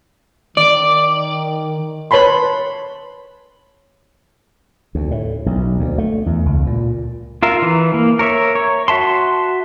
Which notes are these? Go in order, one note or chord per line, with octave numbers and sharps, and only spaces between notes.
D#3 D5
B4 C#5 A5 B5 C6
D2
A2
B1
D2
A3
E2
C#2
A#2
F4 A#4 E5
E3
A#3
A#4 C#5 E5
C#5
F#4 E5 A5 C6